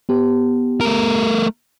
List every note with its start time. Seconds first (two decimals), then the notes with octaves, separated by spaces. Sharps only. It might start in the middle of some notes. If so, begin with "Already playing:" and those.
0.09 B3 G4
0.81 A3 A#4